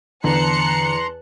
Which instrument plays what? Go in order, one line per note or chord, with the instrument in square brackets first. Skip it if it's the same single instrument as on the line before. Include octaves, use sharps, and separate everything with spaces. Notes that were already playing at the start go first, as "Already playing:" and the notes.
[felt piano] E2 [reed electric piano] D3 [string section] A5 F#6 C#7 [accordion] A#5 C6